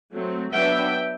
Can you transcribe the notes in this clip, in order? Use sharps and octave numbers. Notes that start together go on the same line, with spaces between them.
F#3 A3 C4
F#3 B3 D4 E5 G5